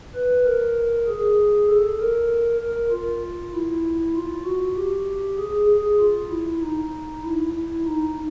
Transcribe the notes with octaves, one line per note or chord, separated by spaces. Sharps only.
B4
A#4
G#4
A4
A#4
A#4
F4
E4
F4
F#4
G4
G#4
G#4
F4
E4
D#4
E4
E4
D#4